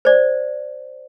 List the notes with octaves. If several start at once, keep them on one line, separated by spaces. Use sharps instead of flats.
C5 D5